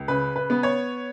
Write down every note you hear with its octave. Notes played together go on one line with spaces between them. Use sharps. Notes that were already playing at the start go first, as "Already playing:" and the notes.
Already playing: C#2
C#3 B4
B4
B3
C#5